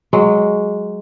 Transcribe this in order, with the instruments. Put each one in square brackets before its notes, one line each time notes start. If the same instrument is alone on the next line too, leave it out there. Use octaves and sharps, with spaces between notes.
[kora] F#3 G#3